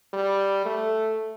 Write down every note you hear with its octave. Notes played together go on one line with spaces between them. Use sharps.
G3
A3